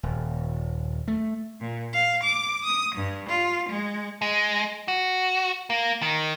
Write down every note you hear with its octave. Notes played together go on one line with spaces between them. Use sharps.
D#1
A3
A#2
F5
D6
D#6
G2
F4
G#3
G#3
F#4
A#3
D#3